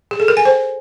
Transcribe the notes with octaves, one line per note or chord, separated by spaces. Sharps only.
G#4
A4
A#4
G#5
C5